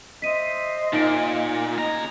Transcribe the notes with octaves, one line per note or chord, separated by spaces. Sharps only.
C5 D#5 E5 B6 D#7
A#2 D#4 D7
C#3 D#5 G#5 A#5